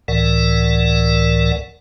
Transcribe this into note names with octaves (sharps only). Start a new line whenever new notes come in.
C#2 A2 E3 A#4 D5 F#5